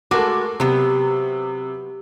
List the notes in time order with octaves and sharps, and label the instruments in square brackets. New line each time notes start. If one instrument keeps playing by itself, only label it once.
[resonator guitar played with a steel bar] G#3 A3 F#4 [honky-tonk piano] A4 A#4 D6
[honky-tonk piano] C3 [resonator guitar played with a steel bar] F#3 B3 [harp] G4